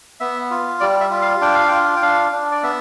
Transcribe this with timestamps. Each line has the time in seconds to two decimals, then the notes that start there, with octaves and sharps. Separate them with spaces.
0.20 B3 E5
0.50 F4
0.80 G3 D5
1.01 E5
1.11 F4
1.22 F5
1.41 D4 G5
1.55 F5
1.68 F4 G5
1.96 G5
2.02 D4 F5
2.32 D4
2.52 D5
2.63 B3 E5